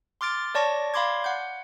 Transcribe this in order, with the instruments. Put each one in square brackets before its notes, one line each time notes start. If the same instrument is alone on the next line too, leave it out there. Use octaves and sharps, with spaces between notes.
[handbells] C6 D6 F6 A6 D7
C#5 D5 A5 C#6 A#6
D5 F5 B5 C6 D6 G#6
F#5 G6